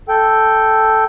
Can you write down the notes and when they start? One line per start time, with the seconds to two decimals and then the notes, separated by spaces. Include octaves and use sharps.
0.09 A4 G5